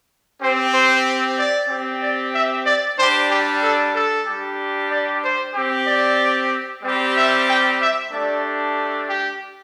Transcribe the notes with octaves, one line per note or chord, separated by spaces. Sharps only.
C4 G4 C5
C5
D5
C4 G4
D5
E5
D5
G3 D4 G4 C5
G4
A4
A4
G3 D4 G4
D5
C5
C4 G4
D5
G3 C4 G4
E5
G5
E5
A3 D4 G4 D5
G4